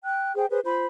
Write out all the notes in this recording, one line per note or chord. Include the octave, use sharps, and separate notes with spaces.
G5 F#6
G#4 C5 G5
G#4 B4 C5
F4 C5 B5